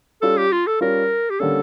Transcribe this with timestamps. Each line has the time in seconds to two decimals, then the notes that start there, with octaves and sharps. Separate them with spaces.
0.22 G3 C#4 F4 A4
0.37 G4
0.52 F4
0.67 A4
0.80 G3 C#4 F4 A#4
1.30 G4
1.40 D3 G3 A#3 C#4 A4